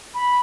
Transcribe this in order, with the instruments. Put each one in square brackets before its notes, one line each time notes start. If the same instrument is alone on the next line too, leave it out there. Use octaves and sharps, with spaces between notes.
[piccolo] B5